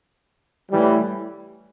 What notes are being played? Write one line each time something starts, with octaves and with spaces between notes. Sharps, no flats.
A2 E3 G3